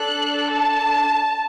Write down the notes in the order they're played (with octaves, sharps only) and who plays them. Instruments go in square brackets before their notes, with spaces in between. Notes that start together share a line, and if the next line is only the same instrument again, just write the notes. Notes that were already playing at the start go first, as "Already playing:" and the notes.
Already playing: [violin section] D4 A4 F#6
A5